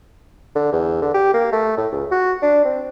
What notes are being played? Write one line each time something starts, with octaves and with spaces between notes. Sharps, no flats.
D3
E2
D3
G4
A#3
A3
A2
C#2
F#4
D4
C4